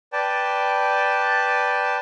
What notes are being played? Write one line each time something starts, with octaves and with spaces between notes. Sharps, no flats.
B4 D5 G5 A5